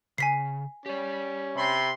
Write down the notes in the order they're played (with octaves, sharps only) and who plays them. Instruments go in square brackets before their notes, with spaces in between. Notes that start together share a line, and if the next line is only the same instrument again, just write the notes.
[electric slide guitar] C#3 [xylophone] G#5 B6 C7
[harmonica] C#4 [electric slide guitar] G4 D5
[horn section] C3 B5 C6